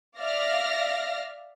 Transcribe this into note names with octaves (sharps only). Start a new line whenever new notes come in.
D5 E5 F5 F6 A#6